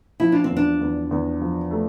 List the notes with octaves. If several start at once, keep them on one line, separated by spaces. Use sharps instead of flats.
F3 E4
D4
C4
E2
D4
E2
E2
F3
A3